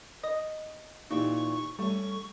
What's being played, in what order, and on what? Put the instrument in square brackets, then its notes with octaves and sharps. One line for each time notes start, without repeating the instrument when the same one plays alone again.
[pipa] D#5
[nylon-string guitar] A#2 E3 G4 [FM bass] D#4 [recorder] C#6
[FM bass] G3 [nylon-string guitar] A3 C#4 [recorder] C#6